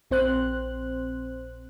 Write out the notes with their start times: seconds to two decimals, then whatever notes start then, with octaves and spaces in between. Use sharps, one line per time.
0.11 A#1 C4 C5 F#6